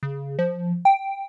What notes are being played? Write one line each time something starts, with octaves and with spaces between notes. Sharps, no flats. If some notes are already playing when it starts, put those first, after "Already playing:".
C#3
F3
G5